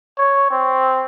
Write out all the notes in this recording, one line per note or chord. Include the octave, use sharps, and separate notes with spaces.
C#5
C4